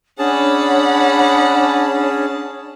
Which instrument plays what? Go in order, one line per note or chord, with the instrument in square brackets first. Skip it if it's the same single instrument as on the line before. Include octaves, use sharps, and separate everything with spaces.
[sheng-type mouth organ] C#4 G#4 A5 [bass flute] D4 [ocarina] C#5 [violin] F#5 B5